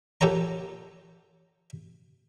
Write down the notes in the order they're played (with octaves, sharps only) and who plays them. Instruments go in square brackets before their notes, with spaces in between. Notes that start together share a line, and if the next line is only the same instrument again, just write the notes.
[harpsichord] A#2 G4 A4 C#5 A#5